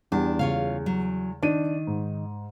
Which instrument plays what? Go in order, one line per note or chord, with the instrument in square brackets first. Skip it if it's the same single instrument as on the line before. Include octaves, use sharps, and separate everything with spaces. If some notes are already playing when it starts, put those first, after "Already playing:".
[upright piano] E2 [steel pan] G3 [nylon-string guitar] D4
[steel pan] C#3 [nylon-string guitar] F4 C#5 F5
[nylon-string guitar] F#3
[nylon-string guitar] D#3 [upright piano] D4 D#7
[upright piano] G#2